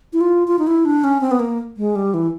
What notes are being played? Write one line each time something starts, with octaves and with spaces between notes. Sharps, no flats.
E4
F4
F4
D#4
E4
D4
C#4
C4
B3
A#3
G#3
G3
E3